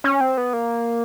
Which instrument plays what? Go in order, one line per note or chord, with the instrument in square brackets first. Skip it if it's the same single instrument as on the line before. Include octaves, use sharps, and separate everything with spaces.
[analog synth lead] C#4
C4
B3
A#3